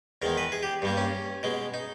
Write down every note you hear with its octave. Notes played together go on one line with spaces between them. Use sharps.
E2 D#3 G#3 A#4
B4
G#4
G4
G2 G3 A#3
C#4
B2 G#3
D#4